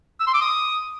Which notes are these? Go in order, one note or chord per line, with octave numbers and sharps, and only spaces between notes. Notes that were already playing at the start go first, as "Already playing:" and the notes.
E6
C6
D6
D#6